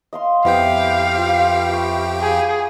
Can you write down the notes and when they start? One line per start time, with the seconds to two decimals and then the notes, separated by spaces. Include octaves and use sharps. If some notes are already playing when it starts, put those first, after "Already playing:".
0.13 D#5 F5 C6
0.45 F2 B3 E4 G4 C5 F5 G5
1.17 F4
1.69 E5 B5 C#6
2.20 G#4 F5